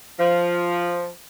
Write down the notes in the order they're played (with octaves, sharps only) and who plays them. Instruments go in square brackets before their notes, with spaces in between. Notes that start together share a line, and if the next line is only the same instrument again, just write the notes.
[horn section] F3